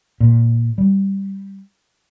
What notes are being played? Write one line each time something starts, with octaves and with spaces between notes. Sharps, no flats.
A#2
G3